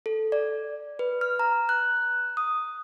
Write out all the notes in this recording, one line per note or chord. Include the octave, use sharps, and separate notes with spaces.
A4
D5
B4
F6
A#5
F#6
D#6